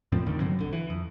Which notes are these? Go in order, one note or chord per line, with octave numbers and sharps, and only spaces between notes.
F2 A2 F3 C4
A1 E2 D3 D#3
G2 D3 F#3 C4
B1 D3
E3
F2